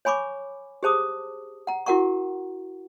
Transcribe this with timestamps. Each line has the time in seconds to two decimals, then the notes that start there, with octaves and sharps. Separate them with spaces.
0.05 C#5 G#5 B5 C#6 D6
0.83 G4 G#4 C5 A5 D6 D#6
1.67 F#5 A#5
1.86 E4 F#4 A#4 F#5 A#5 C#6